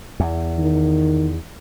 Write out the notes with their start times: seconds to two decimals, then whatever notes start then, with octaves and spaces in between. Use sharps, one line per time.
0.20 E2
0.59 D#3